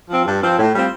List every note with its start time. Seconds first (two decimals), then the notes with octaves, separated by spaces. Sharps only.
0.09 F3 C4
0.25 G2
0.42 F3 C4
0.58 A2
0.73 G3 C4 F4